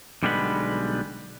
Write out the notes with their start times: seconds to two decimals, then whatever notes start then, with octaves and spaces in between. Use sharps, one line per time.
0.23 B1 D3 G3 G#3 B3 B4